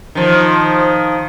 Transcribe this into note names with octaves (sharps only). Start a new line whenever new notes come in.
D#3 F3